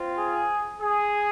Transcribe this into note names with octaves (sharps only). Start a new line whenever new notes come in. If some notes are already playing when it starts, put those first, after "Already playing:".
Already playing: C4 F4
G#4
G#4